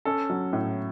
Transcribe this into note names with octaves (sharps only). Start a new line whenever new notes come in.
C#4 A4
F#3
A2